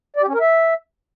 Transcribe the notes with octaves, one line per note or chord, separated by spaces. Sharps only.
D5
G4
C#4
A#4
E5